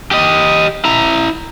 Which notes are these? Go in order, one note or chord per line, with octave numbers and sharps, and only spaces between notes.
G4 D#5
E4 A#5